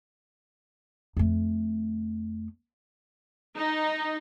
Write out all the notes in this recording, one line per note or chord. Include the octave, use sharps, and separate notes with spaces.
F2 A3
D#4